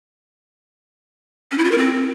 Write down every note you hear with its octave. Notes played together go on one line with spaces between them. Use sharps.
C#4
E4
F4
A#4
C4